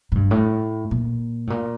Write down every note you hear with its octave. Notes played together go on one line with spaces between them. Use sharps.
A2
G2
A2
A#2
A2
A#2